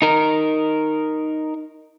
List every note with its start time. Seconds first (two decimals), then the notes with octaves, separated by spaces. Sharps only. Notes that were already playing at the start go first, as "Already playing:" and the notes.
0.02 D#4 A#4